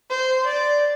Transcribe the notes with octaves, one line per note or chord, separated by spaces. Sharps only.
C5
D5